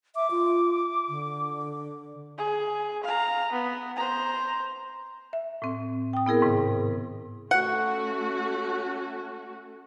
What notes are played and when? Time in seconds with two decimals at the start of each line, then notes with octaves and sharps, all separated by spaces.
0.16 E5 D6
0.31 F4
1.09 D3
2.38 G#4
3.03 F5 A#5
3.52 B3
3.96 C5 A#5
5.33 E5
5.62 A2 C4
6.13 G5 D#6
6.26 B3 E4 G#4 A#4
6.42 G#2 C3 D#3
7.51 A3 C#4 F#4 F#5